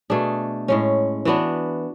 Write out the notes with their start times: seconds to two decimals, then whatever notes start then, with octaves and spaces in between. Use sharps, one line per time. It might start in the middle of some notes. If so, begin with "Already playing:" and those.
0.10 B2 A3 D4 G#4
0.68 A2 G#3 C#4
1.25 E3 B3 D4 F#4